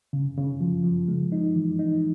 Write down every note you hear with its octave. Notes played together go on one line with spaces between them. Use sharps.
C#3
C#3
F3
F3
G#3
D#4
E3
D#4